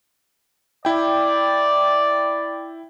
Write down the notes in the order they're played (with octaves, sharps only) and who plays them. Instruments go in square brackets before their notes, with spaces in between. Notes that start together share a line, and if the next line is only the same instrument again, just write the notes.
[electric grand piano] E4 G5 [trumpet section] D5